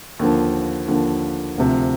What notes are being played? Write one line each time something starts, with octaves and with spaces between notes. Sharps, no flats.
D#2 D3 F3
D#2 D3 F3
D2 C3 F3